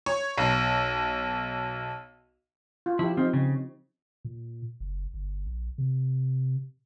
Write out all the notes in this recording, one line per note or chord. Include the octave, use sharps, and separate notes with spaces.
C#5
B1
F4
F3 E4 G4
F3 C4 D#4
C#3
A#2
F#1
G1
A#1
C3